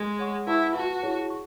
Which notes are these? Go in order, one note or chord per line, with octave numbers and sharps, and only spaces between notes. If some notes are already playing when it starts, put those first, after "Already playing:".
Already playing: G#3
C#5 F#5 C#6
E4 B4 F#5 A5 C#6
F#4 B4 F#5 A5
E4 G#4 C#5 F#5 A5
C#6